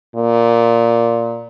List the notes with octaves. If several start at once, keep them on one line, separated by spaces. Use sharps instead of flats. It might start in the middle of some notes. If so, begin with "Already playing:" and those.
A#2